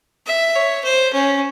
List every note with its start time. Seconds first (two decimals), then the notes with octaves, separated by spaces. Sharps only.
0.26 E5
0.56 C#5
0.85 C5
1.13 C#4